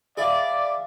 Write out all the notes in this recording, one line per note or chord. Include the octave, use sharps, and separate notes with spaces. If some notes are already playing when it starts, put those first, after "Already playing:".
E4 G#4 D5 F5